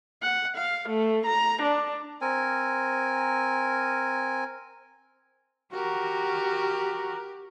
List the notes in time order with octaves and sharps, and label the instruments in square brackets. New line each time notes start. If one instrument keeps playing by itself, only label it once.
[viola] F#5
F5
A3
A#5
D4
[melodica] C4 A#4 G#5
[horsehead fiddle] F#4 A#4 [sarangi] G4